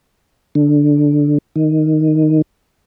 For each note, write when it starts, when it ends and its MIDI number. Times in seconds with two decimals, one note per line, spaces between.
0.55 1.38 50
1.56 2.42 51